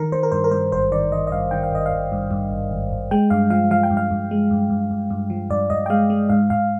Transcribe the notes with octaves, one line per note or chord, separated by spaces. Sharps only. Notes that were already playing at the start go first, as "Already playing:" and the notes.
Already playing: D#3 A#4
D#3 C5
A#4
G2 C5
A#4
G2 C5
G#1 C5
D#3 D5
D#3 D#5
D#5
G2 F5
D#3 G5
F5
G#1 D#5
F5
G#1
G2
G2
G#1
G#1
G#1
G#3 G5
G2 F5
F3 F5
F3 F5
G5
G2
F5
G2
G#3
G2
G2
G2
G2
F3
G2 D5
G2 D#5
G5
G#3 F5
G#3
G#2 F5
G#2 F5